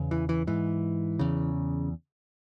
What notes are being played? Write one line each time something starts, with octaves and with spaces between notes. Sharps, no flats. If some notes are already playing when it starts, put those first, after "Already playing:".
Already playing: E2 C#3
E3
E3
G#2 E3
E2 C#3